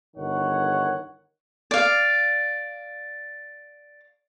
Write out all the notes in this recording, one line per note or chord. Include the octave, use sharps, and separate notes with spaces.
G1 D#3 C#5 F#5
D5 F5